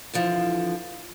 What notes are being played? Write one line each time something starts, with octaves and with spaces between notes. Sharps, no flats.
D3 E3 F3